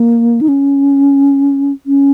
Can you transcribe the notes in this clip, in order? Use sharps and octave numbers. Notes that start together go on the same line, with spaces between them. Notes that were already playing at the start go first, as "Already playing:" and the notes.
Already playing: A#3
D#4
C#4
C#4